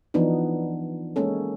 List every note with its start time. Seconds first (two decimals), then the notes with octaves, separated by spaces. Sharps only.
0.14 E3 F3 B3 D4 D#4
1.16 G#3 A#3 C#4 A4